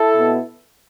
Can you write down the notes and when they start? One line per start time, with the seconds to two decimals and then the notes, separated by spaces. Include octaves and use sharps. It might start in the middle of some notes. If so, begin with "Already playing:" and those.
Already playing: E4 A4
0.15 B2 B3